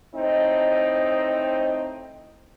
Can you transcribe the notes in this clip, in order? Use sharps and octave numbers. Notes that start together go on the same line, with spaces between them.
A2 C4 D#4 D#5